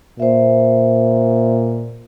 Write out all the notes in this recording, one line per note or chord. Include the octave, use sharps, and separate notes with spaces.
A#2 C5 E5